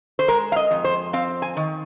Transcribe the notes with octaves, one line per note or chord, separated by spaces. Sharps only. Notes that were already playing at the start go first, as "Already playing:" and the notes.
C5
G#3 A#4
F5
D#5
F2
C5
C4 F5
G#5
D#3